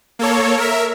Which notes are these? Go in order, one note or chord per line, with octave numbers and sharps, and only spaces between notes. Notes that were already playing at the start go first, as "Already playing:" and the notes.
A#3 A4 C#5
A#4 E5